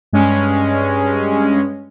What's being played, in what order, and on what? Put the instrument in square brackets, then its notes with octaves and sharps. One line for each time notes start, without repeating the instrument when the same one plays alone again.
[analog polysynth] G2 G#3 C#4